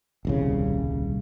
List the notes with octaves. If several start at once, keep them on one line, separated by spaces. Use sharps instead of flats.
D#1 C2 C#3